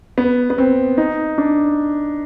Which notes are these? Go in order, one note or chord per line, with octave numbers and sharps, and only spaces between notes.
B3
B3
C4
D#4
D4